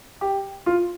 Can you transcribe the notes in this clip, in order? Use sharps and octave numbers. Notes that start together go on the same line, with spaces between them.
G4
F4